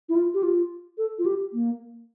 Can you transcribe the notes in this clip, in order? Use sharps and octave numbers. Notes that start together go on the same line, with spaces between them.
E4
F4
G4
F4
A4
F4
G4
A#3